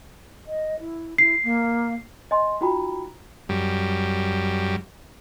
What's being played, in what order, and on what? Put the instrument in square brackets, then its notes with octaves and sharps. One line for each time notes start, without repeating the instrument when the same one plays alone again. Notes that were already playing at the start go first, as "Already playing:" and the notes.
[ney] D#5
E4
[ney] E4 [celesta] C7
[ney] A#3
[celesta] D#5 G#5 C6
D#4 F4 F#4 G5 A#5 B5
[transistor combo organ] F#2 G3